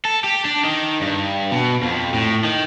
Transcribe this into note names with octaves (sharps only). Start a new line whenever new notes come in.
A4
G4
D4
D#3
G2
B2
F2
A2
D#3